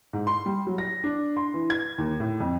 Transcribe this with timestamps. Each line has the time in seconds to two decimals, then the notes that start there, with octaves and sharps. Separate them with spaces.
0.13 G#2
0.27 C6
0.46 G3
0.67 F#3
0.78 A#6
1.04 D4
1.37 C6
1.54 E3
1.70 G#6
1.98 D#2
2.20 A2
2.40 F2